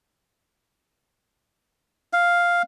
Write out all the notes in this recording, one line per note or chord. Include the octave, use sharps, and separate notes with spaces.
F5